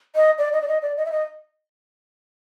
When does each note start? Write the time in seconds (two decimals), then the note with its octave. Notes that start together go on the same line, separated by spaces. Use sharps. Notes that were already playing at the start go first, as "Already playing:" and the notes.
0.15 D#5
0.38 D5
0.53 D#5
0.62 D5
0.68 D#5
0.82 D5
0.97 D#5
1.05 E5
1.12 D#5